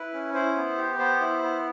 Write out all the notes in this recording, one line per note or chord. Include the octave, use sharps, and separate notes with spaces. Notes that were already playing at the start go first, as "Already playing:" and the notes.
Already playing: E4 B4
C#4
E4 C5
B3
G4
B3 C5
E4
B3